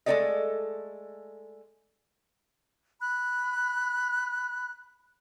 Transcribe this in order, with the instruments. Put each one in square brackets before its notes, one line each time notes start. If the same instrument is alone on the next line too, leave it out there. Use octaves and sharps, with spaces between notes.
[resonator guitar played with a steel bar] G#3 A3 D#4 A4 D5 D#5
[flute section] B5 F#6